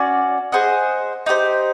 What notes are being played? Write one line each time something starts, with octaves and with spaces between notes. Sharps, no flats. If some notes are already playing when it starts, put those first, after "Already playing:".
Already playing: C#4 F#4 D5
G#4 C5 D#5 F#5
D#4 G4 C5